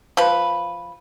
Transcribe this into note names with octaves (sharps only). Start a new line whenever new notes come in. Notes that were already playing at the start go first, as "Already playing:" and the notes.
F3 B4